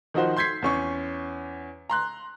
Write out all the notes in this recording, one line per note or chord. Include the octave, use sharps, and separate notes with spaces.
D#3 F3 D#4 F#4 C5
C6 G6 G#6 B6 C7
E2 C#4 C#6
A#5 C6 F#6